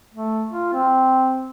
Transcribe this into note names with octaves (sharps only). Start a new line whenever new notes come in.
A3
F4
C4